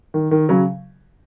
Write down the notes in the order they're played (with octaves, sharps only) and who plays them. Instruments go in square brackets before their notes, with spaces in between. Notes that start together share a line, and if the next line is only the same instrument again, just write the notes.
[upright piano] D#3
D#3
C#3 F#3